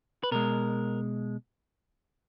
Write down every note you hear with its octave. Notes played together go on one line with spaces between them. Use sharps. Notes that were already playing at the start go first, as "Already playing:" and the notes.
B4
B2 G#3 A#4